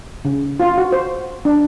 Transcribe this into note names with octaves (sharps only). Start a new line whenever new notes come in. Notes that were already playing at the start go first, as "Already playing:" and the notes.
C#3
F4
F#4
C5
D4